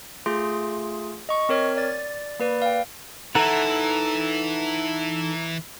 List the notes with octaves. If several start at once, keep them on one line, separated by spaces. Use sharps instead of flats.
A3 F4 G#4 C6
D#5 C#6
C4 A#4 C#5 F6
D5 A6
A#3 B4 D5
F5 G5
E3 D#4 A4 E5 F#5 A#5